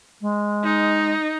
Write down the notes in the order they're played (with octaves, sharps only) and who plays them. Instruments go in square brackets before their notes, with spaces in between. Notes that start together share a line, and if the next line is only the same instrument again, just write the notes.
[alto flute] G#3
[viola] D#4